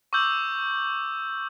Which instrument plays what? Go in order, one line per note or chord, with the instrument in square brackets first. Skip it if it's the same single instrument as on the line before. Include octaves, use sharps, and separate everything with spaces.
[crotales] C#6 D6 E6 G6 F#7